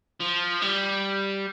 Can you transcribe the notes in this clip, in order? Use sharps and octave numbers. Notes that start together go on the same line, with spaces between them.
F3
G3